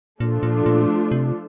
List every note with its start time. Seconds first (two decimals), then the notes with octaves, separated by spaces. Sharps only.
0.20 A#2 F3 A3 D4 F4 A4
0.43 A#2
0.66 A#2
1.11 C3